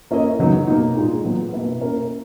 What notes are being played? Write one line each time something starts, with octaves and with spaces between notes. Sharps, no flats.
A#3 C#4 E4 A#4 D#5
C#3 F#3 B3 D#4
B2 A#3 D#4
A#2 G#3 D#4 G#4
A#2 F#3 B3
B2 A#3 E4 B4
A#3 C#4 E4 A#4